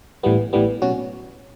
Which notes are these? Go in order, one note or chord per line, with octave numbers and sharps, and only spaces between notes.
A1 A2 E3 G3 B3
A1 A2 E3 G3 B3
B2 F#3 C#4 F#4